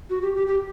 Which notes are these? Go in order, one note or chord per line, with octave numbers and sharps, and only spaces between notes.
F#4
G4
G4
G4